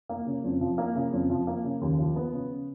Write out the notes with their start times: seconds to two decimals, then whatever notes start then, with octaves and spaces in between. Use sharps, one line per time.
0.09 A#3
0.26 C#3
0.44 F2
0.61 F3
0.78 A#3
0.95 C#3
1.13 F2
1.30 F3
1.47 A#3
1.64 C#3
1.81 D#2
1.99 F3
2.16 B3
2.33 C#3